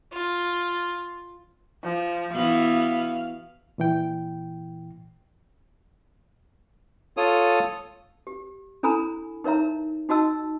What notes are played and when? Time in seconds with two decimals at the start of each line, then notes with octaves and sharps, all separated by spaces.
0.12 F4
1.84 F3
2.33 E3 B3 F#4 F5
3.78 A#2 E3 G5
7.17 F4 A4 C#5 D#6
8.27 G4
8.83 D4 E4 A4 G#5 A#5 B5
9.44 D#4 A#4 C#5 E5 A#5
10.09 D#4 F#4 D#5 A5 E6